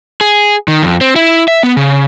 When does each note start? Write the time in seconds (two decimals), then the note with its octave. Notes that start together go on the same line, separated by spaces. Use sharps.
0.21 G#4
0.68 D#3
0.83 F2
1.01 C4
1.16 E4
1.48 E5
1.63 B3
1.77 C#3